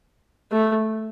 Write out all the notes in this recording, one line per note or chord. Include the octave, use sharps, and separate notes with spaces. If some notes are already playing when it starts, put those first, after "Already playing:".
A3